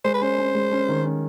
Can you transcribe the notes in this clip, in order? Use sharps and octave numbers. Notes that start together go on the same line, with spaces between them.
G#3 C5
B4
C#4 C5
C#4
G#3
C#4
D#3
C#4